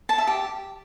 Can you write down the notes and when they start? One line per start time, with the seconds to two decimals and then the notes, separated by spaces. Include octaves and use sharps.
0.09 A5
0.18 E5
0.27 G4